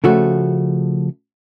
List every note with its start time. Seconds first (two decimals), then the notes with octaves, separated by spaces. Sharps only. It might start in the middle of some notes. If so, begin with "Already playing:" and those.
0.04 C#3 F3 A3 F#4